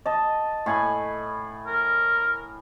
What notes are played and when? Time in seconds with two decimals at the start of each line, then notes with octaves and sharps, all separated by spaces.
0.06 D#5 A5
0.66 A2 G#5 B5
1.67 A#4